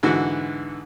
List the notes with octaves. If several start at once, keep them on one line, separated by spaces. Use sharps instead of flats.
G#2 D3 E3 F#4